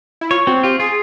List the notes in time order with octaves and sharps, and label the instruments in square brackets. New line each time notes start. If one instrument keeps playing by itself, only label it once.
[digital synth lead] E4
[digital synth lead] F4 [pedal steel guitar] C#5
[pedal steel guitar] C4 [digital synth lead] F#4
[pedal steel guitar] F4 [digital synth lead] G4
[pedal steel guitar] F4 [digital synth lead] G#4